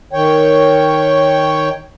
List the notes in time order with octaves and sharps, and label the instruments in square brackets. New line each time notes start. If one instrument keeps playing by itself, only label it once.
[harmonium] D#3 C#5 G5